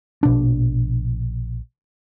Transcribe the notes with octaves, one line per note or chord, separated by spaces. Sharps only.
A#1 B2 D4